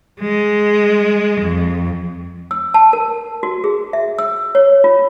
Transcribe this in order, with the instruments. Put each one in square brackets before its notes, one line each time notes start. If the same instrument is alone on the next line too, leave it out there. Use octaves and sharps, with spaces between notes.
[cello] G#3
F2
[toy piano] E6
A5
A#4
F#4
G#4
E5
E6
C#5
F4